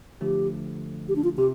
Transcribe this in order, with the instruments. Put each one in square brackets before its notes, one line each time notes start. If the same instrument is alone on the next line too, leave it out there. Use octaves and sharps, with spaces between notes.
[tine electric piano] D3 F3 A3 [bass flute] G4
[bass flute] G4
D4
F4
[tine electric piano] C3 [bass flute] G4